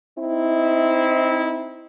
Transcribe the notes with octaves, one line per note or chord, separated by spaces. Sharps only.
C4 D#4 E4